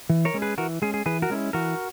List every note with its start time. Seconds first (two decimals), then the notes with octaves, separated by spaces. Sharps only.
0.10 E3
0.25 A#4 C#5
0.34 G#3 C#4
0.42 G#4 B4
0.58 E3 F#4 A#4
0.82 G#3 C#4 G#4
0.94 G#4
1.06 E3 G#4 B4
1.22 F#4 A#4
1.30 G#3 C#4 E4
1.53 E3 F#4 A#4